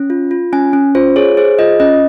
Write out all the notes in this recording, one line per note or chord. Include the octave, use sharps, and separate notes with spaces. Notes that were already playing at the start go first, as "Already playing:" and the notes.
Already playing: C#4
F4
F4
C#4 G#5
C#4
F4 C5
G#4 C#5
G#4 C5
F4 D#5
C#4 D#5